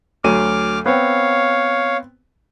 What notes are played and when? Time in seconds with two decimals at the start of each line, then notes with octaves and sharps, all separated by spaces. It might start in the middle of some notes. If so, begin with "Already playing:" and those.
0.24 D2 F#3 D6 F6 D#7
0.86 B3 C4 C#5 F5